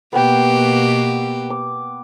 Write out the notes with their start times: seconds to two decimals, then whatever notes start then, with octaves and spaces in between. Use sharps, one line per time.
0.13 B2 A#3 B3 G4 B4 G5
1.50 D6